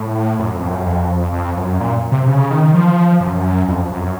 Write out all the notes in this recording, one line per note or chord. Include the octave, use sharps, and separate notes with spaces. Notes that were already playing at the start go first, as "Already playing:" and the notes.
Already playing: A2
F#2
F2
F#2
F2
F2
F#2
A#2
C3
C#3
D#3
F3
F#2
F2
F#2